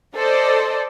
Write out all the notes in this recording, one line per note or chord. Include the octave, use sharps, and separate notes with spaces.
A4 C5 D5 D#5